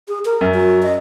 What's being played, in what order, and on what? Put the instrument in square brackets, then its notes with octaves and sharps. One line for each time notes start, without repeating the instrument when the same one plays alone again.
[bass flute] G#4
A#4
[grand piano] F#2
[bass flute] F#4
D#5